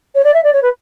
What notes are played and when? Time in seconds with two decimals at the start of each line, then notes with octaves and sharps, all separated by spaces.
0.15 C#5
0.24 D5
0.34 E5
0.44 D5
0.53 C#5
0.62 B4